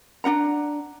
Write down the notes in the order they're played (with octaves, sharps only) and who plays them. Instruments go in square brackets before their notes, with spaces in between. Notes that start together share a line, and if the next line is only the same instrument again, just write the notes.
[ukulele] D4 D#4 F#5 A#5